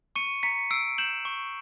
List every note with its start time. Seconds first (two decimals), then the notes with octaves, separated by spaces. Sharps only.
0.16 C#6 C#7 D#7
0.43 A#5 B6 C#7
0.70 E6 C7 D7
0.98 G6 E7 F#7
1.25 C#6